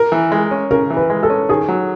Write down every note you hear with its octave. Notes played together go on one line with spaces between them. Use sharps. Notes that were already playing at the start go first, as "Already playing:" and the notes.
Already playing: A#4
E3
G#3
C#4
C#3 A#4
E3
B4
G#3
A4
C#4
D#3 G#4
F#3